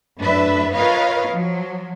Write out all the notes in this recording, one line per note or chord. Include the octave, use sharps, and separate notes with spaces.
F#2 A2 D4 B4 E5
F4 A#4 B4 C#5 D#5 F5
F3 F#3